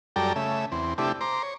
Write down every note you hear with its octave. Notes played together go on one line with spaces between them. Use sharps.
F#2 G3 A4 D5 G5 A#5
C#3 A3 E5
E2 C4
C3 A3 D4 E4 G4
C5 A#5 D6
C#5